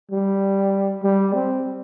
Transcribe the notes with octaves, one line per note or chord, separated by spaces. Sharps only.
G3
G3
C4